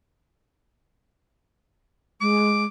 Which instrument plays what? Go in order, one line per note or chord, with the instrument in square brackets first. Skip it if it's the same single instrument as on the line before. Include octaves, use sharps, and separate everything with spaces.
[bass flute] G#3 [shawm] D6